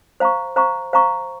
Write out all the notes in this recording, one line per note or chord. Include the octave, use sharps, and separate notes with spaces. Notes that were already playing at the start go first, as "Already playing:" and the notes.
C5 F5 A#5 C#6
C5 F5 A#5 C#6
C5 F5 A#5 C#6